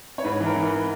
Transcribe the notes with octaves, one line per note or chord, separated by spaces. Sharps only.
C#5
G#2 B4
E3
A#4
E3
B4